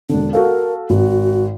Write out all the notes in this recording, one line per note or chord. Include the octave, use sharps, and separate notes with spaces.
E1 D3 D4
F#4 A4 A#4 F5
G#1 F#4